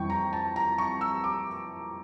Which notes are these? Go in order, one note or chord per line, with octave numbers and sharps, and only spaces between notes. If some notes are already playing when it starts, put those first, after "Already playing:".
Already playing: F2 E3 G3 G5 C#6
A#5
A5
A#5
C#6
E6
D6